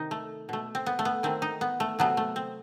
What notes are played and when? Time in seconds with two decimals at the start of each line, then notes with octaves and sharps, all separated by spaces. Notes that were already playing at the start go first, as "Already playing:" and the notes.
Already playing: C3 D#3 D#4
0.11 A3
0.49 B2 A3
0.75 C4
0.86 B3
0.99 A3
1.05 B3
1.23 D#3 A3 C4
1.42 D#4
1.61 B3
1.80 A3
1.99 C3 F#3 A3 B3
2.17 A3
2.36 C4